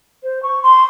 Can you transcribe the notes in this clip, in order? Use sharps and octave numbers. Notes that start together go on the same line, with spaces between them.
C5
C#6
C6